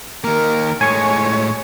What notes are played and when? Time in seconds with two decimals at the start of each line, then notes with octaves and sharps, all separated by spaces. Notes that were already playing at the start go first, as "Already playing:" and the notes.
0.24 D#3 A#3 A#4
0.81 A2 G#3 C#5 G#5 C#6